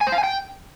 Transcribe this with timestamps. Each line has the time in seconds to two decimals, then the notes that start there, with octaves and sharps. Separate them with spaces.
0.01 G#5
0.07 C5
0.12 F5
0.18 G#5
0.24 G5